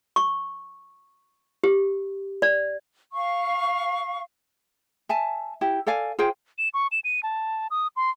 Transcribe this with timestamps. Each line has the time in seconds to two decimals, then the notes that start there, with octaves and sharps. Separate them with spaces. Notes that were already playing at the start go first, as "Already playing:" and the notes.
0.16 C#6
1.64 G4
2.42 D5
3.12 F5 C#6
5.09 E5 G#5 A5
5.61 E4 G4
5.87 A4 D5 F5 G#5
6.19 F4 G#4 C5 G5
6.58 E7
6.74 C#6
6.92 E7
7.04 D#7
7.23 A5
7.71 D#6
7.96 C6